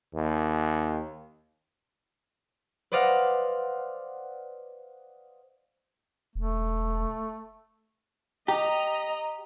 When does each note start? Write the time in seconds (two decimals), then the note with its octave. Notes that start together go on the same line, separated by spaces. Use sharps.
0.15 D#2
2.92 B4 C5 D5 D#5 F5 F#5
6.35 E1 A3
8.48 G4 D#5 A#5